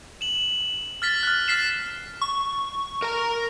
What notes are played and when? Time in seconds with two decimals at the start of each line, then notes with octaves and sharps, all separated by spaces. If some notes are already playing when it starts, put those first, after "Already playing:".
0.21 E7 F#7
1.02 F6 A6 B6
1.23 F6 F#6
1.48 F6 F#6 A6 B6 C7 E7
2.22 C#6
3.02 A#4 A#5